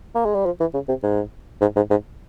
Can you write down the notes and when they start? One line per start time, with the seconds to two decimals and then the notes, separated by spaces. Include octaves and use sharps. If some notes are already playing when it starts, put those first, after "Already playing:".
0.15 A#3
0.25 G#3
0.35 G3
0.46 F3
0.60 E3
0.74 C#3
0.89 C3
1.03 G#2
1.61 G#2
1.76 G#2
1.90 G#2